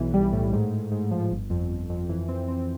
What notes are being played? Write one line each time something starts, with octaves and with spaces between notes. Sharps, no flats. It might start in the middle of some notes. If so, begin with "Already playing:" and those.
Already playing: B1 E3
G3
A2
G#2
G#2
G#2
F3
G1
F2
G1
F2
E3
C4
C4